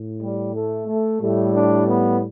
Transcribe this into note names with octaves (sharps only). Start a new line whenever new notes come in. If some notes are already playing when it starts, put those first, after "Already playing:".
Already playing: A2
G3
A3
A3
A2 G3 A3
D4
B3